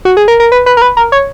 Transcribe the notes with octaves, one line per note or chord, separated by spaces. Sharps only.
F#4
G#4
A#4
A#4
B4
B4
A#4
B4
A#4
C#5